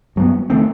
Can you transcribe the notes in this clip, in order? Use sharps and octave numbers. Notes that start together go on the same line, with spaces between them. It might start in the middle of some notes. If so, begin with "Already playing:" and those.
G2 F#3 B3
D#3 A3 C4